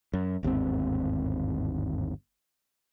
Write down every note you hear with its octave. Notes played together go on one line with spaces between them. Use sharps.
F#2
G1 D#2 G#2 C4